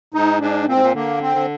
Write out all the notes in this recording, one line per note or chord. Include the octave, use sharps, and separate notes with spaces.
G#2 D#4
G#2 D4
A#2 C4
G#2
A#2
D3 A#3
C4
D3